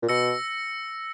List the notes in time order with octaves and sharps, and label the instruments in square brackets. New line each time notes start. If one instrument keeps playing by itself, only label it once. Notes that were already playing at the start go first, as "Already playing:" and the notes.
[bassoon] A#2
[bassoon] B2 [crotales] E6 A#6 C#7